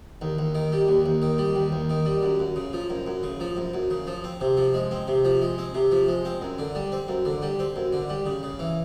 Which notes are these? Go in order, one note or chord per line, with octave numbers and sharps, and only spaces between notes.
D#2
D#2
D#3
G3
D#2
D#2
D#3
G3
D#2
D#2
D#3
G3
F#2
F#2
C#3
F3
F#2
F#2
C#3
F3
F#2
F#2
C#3
F3
C4
C3
F3
G#3
C4
C3
F3
G#3
C4
C3
F3
G#3
C4
F#2
D3
G3
C4
F#2
D3
G3
C4
F#2
D3
G3
C#3
C#3
E3